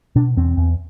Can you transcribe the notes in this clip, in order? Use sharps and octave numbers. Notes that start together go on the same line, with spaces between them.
B2 D4
E2 C4
E2